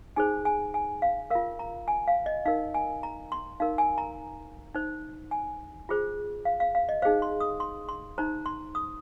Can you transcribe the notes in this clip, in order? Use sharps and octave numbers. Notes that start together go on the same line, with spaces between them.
D#4 G#4 C5 G#5
G#5
G#5
F5
F4 A#4 F5
A#5
G#5
F5
D#5
D#4 A#4 F5
G#5
A#5
C6
D#4 A#4 F5
G#5
A#5
D#4 C5
G#5
F4 G#4 C5
F5
F5
F5
D#5
D#4 G#4 C5 F5
C6
D#6
C6
C6
D#4 C5 A#5
C6
D#6